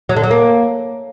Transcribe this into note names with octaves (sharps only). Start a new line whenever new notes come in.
F#3
D3
F#3
A#3